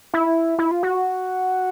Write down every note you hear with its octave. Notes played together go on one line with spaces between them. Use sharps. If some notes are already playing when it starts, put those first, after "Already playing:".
E4
E4
F4
F#4